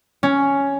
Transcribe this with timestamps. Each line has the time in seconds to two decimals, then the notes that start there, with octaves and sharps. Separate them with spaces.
0.23 C#4